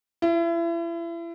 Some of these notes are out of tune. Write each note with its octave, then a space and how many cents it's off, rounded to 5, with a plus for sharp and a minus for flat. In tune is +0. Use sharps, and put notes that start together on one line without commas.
E4 +35